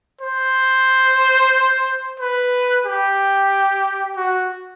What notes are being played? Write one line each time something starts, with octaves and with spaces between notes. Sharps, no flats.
C5
B4
G4
F#4